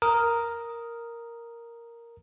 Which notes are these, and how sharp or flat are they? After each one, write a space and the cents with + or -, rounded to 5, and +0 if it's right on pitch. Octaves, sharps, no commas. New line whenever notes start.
A#4 +0 D#6 +0